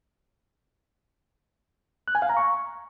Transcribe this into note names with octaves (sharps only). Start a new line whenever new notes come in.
F#6
G#5
F5
A#5
C#6